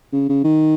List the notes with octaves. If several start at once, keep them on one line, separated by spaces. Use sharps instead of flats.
C#3
C#3
D#3